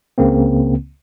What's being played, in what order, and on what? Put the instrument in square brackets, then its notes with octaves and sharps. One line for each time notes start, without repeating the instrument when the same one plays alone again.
[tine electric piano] C#2 C#3 A#3 C4